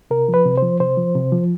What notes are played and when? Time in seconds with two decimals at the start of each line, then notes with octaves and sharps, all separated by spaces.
0.11 C3 A#4
0.29 F3
0.34 B4
0.46 C3
0.58 F3 C5
0.80 C3 C5
0.98 F3
1.15 C3
1.32 F3